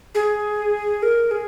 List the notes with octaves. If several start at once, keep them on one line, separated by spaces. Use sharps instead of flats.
G#4
A#4
G#4